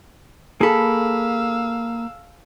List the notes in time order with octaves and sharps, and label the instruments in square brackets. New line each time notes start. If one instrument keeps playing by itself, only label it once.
[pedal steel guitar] A#3 B5 [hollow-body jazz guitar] G#4 A4 [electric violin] F5 E6